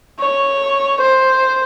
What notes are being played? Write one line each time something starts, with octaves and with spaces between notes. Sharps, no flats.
C#5
C5